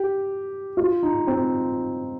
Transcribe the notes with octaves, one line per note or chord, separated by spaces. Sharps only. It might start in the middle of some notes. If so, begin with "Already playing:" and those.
Already playing: G4
F4
D#4
C4